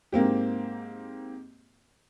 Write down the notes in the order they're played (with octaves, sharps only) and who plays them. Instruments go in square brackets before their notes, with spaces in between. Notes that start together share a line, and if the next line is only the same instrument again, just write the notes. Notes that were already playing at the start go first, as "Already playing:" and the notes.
[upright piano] G#2 A#3 C4 G4